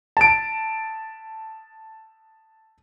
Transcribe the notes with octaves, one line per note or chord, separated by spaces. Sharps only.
A5 D7